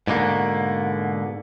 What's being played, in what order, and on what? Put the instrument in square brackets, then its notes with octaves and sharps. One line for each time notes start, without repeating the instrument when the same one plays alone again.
[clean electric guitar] G#2 B2 D3 A#3 B3